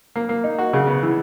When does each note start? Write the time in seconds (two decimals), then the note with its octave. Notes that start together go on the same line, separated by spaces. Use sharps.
0.16 A#3
0.29 A#3
0.44 D#4
0.58 F#4
0.73 C#3
0.87 B3
1.03 E3